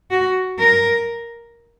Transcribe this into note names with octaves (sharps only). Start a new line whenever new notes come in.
F#4
A#4